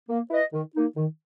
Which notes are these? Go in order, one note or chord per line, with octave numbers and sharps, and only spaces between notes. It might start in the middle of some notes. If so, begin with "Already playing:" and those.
A#3
E4 B4 D#5
D#3
A#3 D#4
D#3